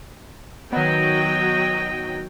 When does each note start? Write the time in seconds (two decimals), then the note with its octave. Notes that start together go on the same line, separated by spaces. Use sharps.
0.73 D#3 F#3 B3 D#5 G5